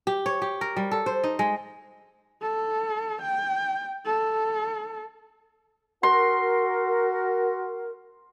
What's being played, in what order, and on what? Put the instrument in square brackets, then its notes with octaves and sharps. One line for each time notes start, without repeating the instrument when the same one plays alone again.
[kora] G4
C#5
G4
A#4
G3
A4
C5
D#4
G#3
[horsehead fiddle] A4
G5
A4
[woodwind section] F#4 A#4 [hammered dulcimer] C6